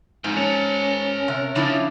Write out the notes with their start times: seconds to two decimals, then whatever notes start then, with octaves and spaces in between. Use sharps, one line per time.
0.24 G#2 F3 C4
0.37 C#4 A#4 A5
1.28 C3
1.55 C#3 F3 D4 E4